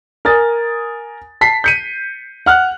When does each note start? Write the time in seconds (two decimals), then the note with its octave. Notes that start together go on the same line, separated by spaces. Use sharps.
0.25 A#4 G#5 D#6 A6
1.41 A5 B6 C7
1.64 G6 C#7 D#7
2.46 F#5 F6 F#6